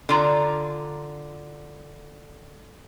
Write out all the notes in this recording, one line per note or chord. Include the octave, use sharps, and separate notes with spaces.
D3 F4 A#5